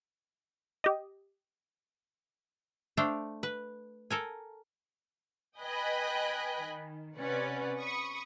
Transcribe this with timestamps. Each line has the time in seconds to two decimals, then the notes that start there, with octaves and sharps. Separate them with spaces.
0.84 G4 D#5
2.97 A3 D4 C5 F5 G5
3.43 B4
4.10 A4 A#4 G#5
5.60 B4 D#5 G5 G#5 B5 F#6
6.64 D#3
7.18 C3 C#4 B4 D5 F#5
7.79 B5 C#6 D#6